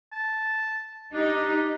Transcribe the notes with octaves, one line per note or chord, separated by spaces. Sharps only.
A5
D4 D#4 G4